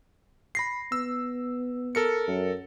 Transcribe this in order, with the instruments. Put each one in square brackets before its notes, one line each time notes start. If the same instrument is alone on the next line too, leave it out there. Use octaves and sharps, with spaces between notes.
[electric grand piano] B5 A#6 C7
[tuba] B3 [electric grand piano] E6
[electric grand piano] A4 A#4 C#7
[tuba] F#2